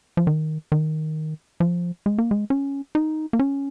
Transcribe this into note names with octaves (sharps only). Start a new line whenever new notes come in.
F3
D#3
D#3
F3
G#3
A#3
G#3
C#4
D#4
A#3
C#4